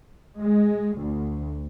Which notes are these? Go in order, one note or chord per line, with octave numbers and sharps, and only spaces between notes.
G#3
D2